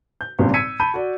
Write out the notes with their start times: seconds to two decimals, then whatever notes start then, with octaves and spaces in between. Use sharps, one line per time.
0.21 G6
0.39 G#1 G2 A#2 C#3 G3
0.54 E6 G#6 B6 C#7 D#7
0.80 A5 B5 G6 D#7
0.94 F#4 D5